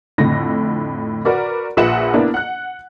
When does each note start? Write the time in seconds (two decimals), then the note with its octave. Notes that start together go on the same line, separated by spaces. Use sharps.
0.18 F2 A2 D3 A#6
1.25 F#4 A#4 B4 D5
1.77 A#1 A#2 B4 E5 F#5 E7
2.14 A#3 B3 D4 E4
2.34 F#5 F#6